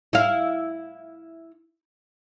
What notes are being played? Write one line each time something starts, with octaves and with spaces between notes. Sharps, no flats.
E4 F5